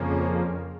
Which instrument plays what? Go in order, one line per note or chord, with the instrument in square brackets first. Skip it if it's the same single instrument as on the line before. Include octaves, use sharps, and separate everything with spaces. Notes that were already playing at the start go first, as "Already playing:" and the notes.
Already playing: [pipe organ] F2 C#3 F3 A#3 [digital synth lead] C#4